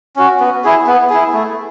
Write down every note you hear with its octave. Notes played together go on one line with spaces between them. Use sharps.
C#4 F#4
B3
E4 G#4
B3
E4 G#4
A3